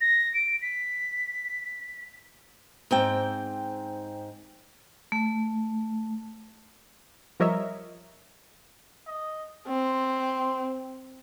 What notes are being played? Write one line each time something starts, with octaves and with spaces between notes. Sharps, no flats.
A#6
D7
B6
G#2 C4 G5
A3
F3 G3 A#4 C#5 D#5 E5
D#5
C4 C6